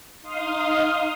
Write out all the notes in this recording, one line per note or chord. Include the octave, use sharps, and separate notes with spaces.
D#4 F5 C6 D#6